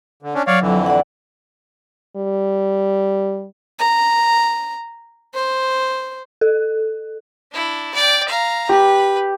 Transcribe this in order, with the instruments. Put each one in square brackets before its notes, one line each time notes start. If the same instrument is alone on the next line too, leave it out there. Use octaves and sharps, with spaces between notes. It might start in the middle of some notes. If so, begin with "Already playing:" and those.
[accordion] D3
C#4 D4
[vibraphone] F#3 D6 [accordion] C#5 D5 F5
[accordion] F2 D3 E3
[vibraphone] D5 F#5
[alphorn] G3
[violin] A#5
C5
[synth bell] A4
[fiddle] D4 E4
D5 G5
F5 A#5
[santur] G4 [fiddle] B4